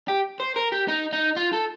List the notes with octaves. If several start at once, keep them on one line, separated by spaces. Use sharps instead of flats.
G4
C5
A#4
G4
D#4
D#4
F4
A4